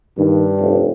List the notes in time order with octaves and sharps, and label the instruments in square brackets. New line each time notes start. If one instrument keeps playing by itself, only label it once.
[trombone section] G2 [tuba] D#3
[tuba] F1